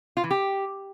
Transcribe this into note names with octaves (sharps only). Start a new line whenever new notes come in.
F4
E3
G4